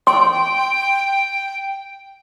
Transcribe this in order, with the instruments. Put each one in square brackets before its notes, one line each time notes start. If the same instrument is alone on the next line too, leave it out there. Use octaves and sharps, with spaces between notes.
[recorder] G5 [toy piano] C6